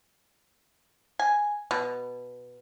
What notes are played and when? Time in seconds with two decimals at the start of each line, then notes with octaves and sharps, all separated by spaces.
1.19 G#5
1.71 B2